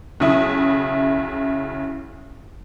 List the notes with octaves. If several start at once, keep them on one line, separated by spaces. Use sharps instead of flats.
B1 C#3 E4 D#6